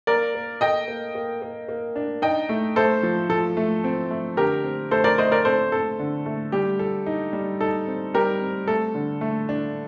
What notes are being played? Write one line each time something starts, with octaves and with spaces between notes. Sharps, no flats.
A#3 A#4 D5
A#3
A4 D#5 G5
A#3
A#3
A#3
A#3
D4
D#4 D#5 G5
A3
A3 A4 C5
F3
F3 A4
A3
C4
A3
D3 G4 A#4
C4
A3 A4 C5
A#4 D5
A3 C5 D#5
A#4 D5
C4 A4 C5
C4 A4
D3
A3
G3 G4
A4
D#4
G3
D#4 A4
C4
G3 G4 A#4
C4
A3 A4
D3
A3
D4